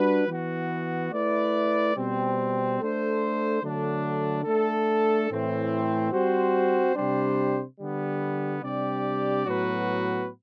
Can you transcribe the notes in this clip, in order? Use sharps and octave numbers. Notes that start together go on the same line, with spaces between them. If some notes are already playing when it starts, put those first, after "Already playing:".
Already playing: G3 D4 F#4 B4
E3 B3 F#4
A3 E4 B4 D5
B2 G3 C4
A3 D4 A4 C5
D3 F#3 A3 D4
A3 D4 A4
A2 E3 A3 C4
G3 C4 F#4 C5
C3 G3 D4 G4 C5
D3 G3 B3
C3 G3 D4 G4 D5
A2 F#3 B3 F#4 B4